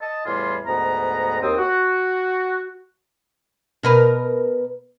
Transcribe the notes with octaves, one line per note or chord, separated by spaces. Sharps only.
D#5 A5
E2 A2 G3 F4 G#5 C6
D2 G#2 B3 A#5
D#2 C4 D#6
F#4
B2 A#4 B4